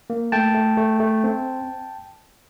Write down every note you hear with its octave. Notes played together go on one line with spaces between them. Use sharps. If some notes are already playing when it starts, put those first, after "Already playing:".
A#3
A3 G5 A5
A3
A3
A3
C4